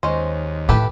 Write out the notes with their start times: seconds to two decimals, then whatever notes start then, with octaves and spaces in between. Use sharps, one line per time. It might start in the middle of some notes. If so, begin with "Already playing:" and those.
0.03 D#2 G#3 C#4 C5
0.69 A2 G4 A4 B4